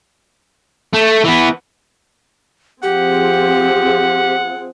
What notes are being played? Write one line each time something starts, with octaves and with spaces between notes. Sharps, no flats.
A3
E3 B3
F3 C4 G4 G#4 F#5